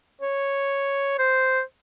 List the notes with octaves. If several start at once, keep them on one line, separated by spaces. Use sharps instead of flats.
C#5
C5